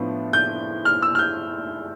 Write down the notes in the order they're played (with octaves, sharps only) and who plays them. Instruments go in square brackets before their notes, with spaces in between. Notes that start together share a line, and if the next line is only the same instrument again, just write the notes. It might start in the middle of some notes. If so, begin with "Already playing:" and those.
Already playing: [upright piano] A2 F3 B3 D4
G6
F6
E6
F6
G6